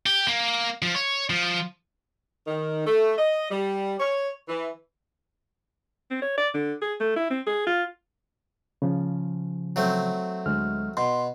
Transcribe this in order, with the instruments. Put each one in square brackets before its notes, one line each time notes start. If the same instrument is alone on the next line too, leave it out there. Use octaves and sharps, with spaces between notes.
[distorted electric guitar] G4
A#3
F3
C#5
F3
[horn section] D#3
A3
D#5
G3
C#5
E3
[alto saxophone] C4
C#5
D5
D3
G#4
A3
E4
C4
G#4
F4
[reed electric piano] C#3 F3
[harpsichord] F#3 A3 C4
[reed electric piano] D2 G#3 F6
[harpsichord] B2 [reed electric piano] C6